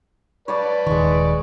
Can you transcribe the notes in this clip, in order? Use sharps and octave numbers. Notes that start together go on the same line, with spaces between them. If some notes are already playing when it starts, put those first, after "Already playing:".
B4 C#5 D5 A5 D6
D#1 D#3 G#3 C#6